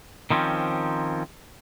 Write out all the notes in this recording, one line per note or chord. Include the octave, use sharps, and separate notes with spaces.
D#3 F3 C4 C#4